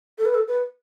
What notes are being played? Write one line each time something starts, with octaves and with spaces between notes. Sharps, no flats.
A4
B4
A4
B4